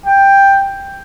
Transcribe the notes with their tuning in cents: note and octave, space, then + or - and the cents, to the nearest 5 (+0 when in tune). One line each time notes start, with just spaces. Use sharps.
G5 +10